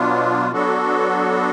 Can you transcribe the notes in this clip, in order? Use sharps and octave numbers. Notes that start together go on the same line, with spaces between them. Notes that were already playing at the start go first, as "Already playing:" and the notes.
Already playing: B2 F#3 B3 D4 F4
F#3 B3 D4 F#4 A4